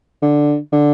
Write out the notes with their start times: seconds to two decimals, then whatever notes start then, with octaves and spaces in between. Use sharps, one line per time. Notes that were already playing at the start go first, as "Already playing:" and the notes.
0.22 D3
0.73 D3